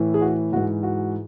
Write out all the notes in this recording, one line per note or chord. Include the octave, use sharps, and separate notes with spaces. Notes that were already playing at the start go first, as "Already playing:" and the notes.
Already playing: A2 E3
G#4
F#4
G#2 E3 F#4
F#4